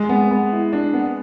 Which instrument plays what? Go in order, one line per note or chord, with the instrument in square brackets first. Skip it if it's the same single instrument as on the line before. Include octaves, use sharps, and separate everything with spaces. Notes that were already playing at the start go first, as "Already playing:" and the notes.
Already playing: [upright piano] G#3
[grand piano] B3
B3
E4
D4
B3